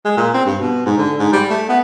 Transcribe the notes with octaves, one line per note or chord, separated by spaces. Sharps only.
G#3
A#2
C4
G2
B2
G#2
D3
G#2
G3
A3
B3